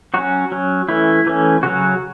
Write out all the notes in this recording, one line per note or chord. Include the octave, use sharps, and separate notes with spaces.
F#3 C#4 F#4
F#3 C#4
E3 A3 C#4 E4
E3 A3 C#4
C#3 F#3 C#4 F#4